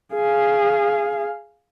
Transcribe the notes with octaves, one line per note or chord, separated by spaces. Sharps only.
G#4 F5